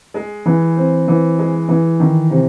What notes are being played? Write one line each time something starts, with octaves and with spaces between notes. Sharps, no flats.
G#3
E3
C4
E3
G#3
E3
D#3
C3